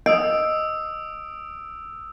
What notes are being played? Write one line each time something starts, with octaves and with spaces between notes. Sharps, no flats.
D#5 D#6 E6 D7